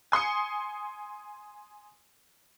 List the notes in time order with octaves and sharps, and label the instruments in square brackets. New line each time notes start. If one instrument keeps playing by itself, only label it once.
[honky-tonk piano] G#5 C6 D#6 C#7